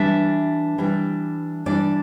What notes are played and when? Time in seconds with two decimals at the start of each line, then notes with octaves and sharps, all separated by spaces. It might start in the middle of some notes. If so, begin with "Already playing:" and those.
Already playing: E3 G3 D4 E5
0.78 E3 G3 D4
1.66 E3 G3 D4 D5